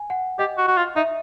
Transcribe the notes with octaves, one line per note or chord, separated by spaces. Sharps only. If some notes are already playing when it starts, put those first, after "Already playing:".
Already playing: G#5
F#5
G4 D#5
F#4
F#4
F4
D#4 E5